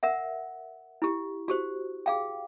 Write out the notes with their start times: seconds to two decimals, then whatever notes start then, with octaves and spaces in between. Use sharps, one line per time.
0.03 A#4 E5 F#5
1.02 E4 G4
1.48 F#4 G4 C5
2.06 G#4 F5 G5